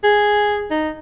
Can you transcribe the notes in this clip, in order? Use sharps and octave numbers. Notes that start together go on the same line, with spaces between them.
G#4
D#4